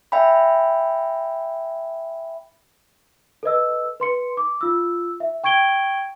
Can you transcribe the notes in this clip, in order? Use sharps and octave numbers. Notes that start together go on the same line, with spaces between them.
E5 G5 G#5 B5
A4 B4 D#5 E6
B4 C6 C#7
D6
F4 E6
E5
G5 C#6 G#6 D7 G7